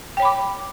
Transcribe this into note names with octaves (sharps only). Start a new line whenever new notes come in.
C#5 G5 B5 D6